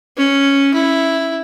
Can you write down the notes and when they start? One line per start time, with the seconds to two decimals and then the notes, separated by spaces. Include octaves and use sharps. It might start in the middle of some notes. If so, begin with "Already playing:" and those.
0.17 C#4
0.74 E4